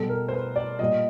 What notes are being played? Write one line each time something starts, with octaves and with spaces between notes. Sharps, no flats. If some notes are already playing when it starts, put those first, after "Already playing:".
Already playing: B2 G3 A4
A#4
C5
B4
D5
A#2 G3 D#5